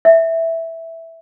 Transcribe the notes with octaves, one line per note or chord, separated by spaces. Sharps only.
E5